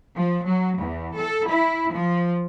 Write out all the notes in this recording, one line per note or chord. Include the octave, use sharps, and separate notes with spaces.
F3
F#3
E2
A4
E4
F3